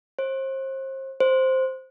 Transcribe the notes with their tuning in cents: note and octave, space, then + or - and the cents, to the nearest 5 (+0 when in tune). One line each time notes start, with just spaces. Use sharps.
C5 +35
C5 +0